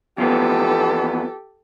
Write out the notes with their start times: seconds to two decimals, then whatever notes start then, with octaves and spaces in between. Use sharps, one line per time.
0.18 E2 F3 B3 G4 A4